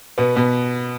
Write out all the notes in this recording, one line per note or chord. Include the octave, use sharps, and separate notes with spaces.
B2 B3
B2 B3